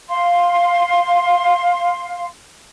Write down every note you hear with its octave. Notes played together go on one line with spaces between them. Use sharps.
F5 C6